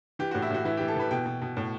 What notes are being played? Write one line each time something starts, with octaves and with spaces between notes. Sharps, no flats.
E3 G4
F#4
A2
E4
A2 F#4
E3 E4
G4
E3
A4
E3 B4
B2 G5
B2
B2
A2